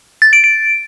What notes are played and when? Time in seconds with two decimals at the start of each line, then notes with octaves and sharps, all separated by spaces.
0.22 A6
0.33 D7
0.44 D7